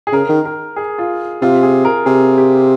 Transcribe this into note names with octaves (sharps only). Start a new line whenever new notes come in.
G#4
C#3 A#4
D#3
A#4
G#4
F4
C3 F4
G#4
A#4
C3 G#4
G4